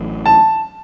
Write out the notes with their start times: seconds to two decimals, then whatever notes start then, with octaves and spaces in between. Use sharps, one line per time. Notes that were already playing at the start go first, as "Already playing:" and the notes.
Already playing: A1 A2 F#3
0.26 A5